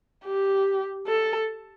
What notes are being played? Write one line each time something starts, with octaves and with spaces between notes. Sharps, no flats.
G4
A4